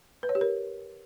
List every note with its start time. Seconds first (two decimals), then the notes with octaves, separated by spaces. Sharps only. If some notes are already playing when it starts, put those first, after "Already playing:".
0.23 B4
0.29 C#5
0.35 G4
0.41 A#4